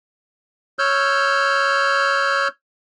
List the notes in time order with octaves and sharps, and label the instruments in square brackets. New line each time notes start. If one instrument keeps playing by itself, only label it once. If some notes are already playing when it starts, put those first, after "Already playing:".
[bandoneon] C#5 E6 F6 G6